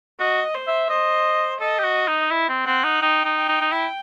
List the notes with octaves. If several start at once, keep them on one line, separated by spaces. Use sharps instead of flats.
F#4 D#5
C5
E5
C5 D#5
A4 D#5
G4
F#4
D#4
E4
C4
C4 F#5
D#4
D#4 G5
D#4
G5
D#4
D#4
E4 G5